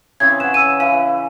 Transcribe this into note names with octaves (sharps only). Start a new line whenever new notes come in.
C#3 E3 C4 G#6
B4 C#5 F#5 E7
E6 D#7
E3 F5